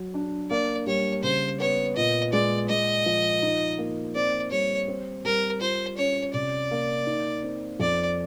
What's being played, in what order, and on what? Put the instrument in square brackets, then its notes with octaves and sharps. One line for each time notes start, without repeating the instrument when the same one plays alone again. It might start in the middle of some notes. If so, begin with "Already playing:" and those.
Already playing: [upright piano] F#3
D4
[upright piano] A#3 [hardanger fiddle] D5
[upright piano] G3 [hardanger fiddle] C#5
[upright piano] C#3 [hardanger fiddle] C5
[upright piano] B3 [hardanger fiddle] C#5
[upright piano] A#2 [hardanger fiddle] D#5
[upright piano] G#3 [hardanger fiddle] D5
[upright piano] G#3 [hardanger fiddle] D#5
[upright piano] F3
D#4
A#3
[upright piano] C4 [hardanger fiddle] D5
[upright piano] G3 [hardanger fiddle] C#5
[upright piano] C4
[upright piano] G3 [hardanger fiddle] A#4
[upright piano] F4 [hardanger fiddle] C5
[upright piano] C#4 [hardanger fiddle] C#5
[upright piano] C3 [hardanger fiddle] D5
[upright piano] A#3
D#4
C4
[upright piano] F2 [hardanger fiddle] D5